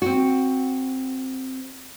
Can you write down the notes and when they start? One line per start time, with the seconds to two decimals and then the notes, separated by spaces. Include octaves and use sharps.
0.02 C4 F#4